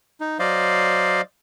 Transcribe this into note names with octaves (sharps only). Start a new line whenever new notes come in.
D#4
F#3 C5 D5 D#5 F5